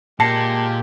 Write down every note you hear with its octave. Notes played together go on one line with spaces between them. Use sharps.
A#2 G#3 A#3 G4 A5 A#6 C7 C#7